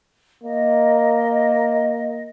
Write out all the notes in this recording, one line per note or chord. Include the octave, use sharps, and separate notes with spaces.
A#3 D#5